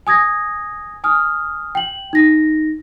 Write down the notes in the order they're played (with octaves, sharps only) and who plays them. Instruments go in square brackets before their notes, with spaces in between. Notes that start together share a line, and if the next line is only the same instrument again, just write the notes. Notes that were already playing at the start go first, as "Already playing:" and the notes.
[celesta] G#5 D#6 G#6 A#6
G#5 D#6 F6
G5 F#7
D#4 A#6